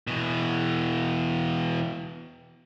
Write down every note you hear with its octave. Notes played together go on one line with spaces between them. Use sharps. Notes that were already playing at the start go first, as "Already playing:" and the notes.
B2 E3